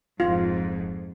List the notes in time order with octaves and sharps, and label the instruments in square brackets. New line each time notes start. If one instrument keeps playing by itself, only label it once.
[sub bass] D1 [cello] F2 G#2 [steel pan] F4